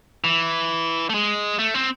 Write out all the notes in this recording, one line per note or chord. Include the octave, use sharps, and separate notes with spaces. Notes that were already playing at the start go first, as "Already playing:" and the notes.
E3
A3
G#3
A3
C4